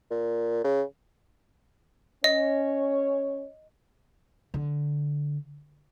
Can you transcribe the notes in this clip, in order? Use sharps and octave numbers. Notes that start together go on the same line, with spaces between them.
A#2
C#3
C#4 C#5 D#5
D3